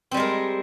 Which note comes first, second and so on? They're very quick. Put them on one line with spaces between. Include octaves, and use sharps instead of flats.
C4 G3 G#3 A#4